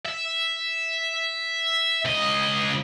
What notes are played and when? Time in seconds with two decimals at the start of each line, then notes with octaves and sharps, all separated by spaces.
0.06 E5
2.05 C#2 D#5